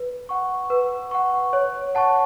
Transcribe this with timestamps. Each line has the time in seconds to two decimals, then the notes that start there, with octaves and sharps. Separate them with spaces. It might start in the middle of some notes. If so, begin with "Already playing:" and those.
Already playing: B4
0.29 F#5 C#6
0.70 B4
1.11 F#5 C#6
1.53 C#5
1.95 F#5 A5 C#6